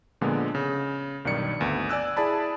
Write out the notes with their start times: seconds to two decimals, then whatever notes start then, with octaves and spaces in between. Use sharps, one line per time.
0.21 A#2 D3 F3 G#3 B3
0.55 C#3
1.25 B1 G2 D#3 D5 C#7
1.60 G#1 D2 B3
1.89 D5 G#5 E6 F#6
2.17 E4 G#4 D5 A5 B5